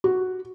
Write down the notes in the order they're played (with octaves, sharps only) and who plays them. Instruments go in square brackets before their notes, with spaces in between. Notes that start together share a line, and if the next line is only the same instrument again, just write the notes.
[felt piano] F#4